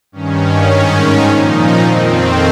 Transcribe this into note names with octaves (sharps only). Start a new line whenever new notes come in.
G2 D#3 C#4
G#2 D#3
A#2 F3 D#4
F2 D#3 C4